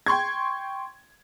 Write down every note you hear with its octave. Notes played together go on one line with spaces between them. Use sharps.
G5 C6 C#6 G#6